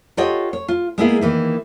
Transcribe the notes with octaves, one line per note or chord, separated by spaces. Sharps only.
F4 G4 A4 C#5 D#5 F#5
C#5
F4
G#3 A#3 B3 E4 G#4
D#3 E3 A#3